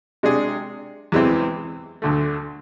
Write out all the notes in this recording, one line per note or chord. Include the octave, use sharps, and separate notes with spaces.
C3 G#3 D4 G#4
E2 C3 E3 G#3 C4
D2 D3 A3